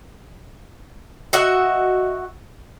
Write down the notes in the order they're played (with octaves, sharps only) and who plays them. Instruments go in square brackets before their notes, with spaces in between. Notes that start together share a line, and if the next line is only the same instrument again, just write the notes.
[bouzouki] F#4 D#5 E5 F#5